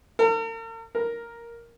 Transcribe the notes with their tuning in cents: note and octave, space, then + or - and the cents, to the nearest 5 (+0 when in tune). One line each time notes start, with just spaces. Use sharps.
A#4 -45
A#4 +5